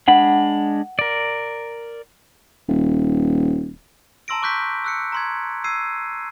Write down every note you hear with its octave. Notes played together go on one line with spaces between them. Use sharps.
G#3 D4 F#5 B5
A#4 D5
D#1
A5 A#5 C6 E6 A#6 D7
C#6 D6 F#6 G6 B6
E6 F#6 C#7
A#5 C6 G#6
E6 G#6 C7 D#7